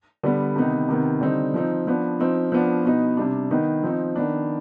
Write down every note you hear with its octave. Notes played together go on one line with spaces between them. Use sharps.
D3 G3 B3
C3 D#3 B3 D#4
C3 D#3 B3
D3 G3 C4 D#4
F3 C4 D#4
F3 B3 D4
F3 C4 D#4
F3 B3 D4
B2 B3 D#4
C3 G3 D4
D#3 B3 D#4
F3 C4 D#4
D#3 B3 D4